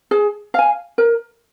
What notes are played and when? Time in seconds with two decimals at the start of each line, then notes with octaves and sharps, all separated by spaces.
0.11 G#4
0.54 F5 G#5
0.98 A#4